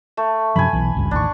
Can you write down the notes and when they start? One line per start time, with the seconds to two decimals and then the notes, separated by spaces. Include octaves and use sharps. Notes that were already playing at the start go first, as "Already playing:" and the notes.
0.17 A3
0.56 F#2 C3 F3 G#5 B5
0.73 B1 E3
0.95 G#1 C#2 G2
1.11 A1 D#2 D4 C#6